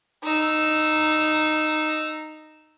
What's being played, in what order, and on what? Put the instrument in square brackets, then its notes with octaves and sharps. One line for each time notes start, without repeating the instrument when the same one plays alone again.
[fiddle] D#4 E6